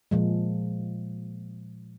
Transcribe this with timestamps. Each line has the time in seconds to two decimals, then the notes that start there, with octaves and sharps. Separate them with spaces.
0.11 A#2 F3 G#3